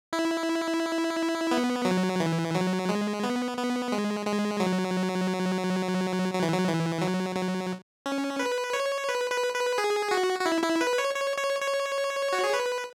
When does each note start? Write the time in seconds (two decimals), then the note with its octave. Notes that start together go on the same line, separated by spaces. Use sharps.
0.13 E4
1.51 B3
1.85 F#3
2.20 E3
2.55 F#3
2.89 G#3
3.24 B3
3.57 B3
3.92 G#3
4.26 G#3
4.60 F#3
6.33 F#3
6.43 E3
6.52 F#3
6.68 E3
7.02 F#3
7.36 F#3
8.06 C#4
8.39 B4
8.73 C#5
9.09 B4
9.31 B4
9.54 B4
9.78 G#4
10.11 F#4
10.40 F#4
10.46 E4
10.63 E4
10.81 B4
10.98 C#5
11.15 C#5
11.38 C#5
11.61 C#5
12.33 F#4
12.44 G#4
12.54 B4